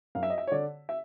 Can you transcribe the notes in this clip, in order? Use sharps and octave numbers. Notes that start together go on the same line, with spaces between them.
F#2 F5
E5
D#5
E5
C#5
D3 D5
E5